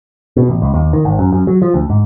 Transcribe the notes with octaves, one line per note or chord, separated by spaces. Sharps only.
B2
A1
C#2
D#2
D#3
G#1
F#2
F#2
F#3
F3
D2
G#2